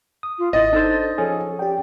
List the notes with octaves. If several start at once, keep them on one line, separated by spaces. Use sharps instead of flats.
D#6
F4
G#1 E4 D#5 A6
D4 D#4 A4 C5
F3 C#4 G#4 A4
G4 D5 G5